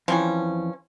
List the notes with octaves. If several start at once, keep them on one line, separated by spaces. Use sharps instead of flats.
F2 E3 F3 G3 C#4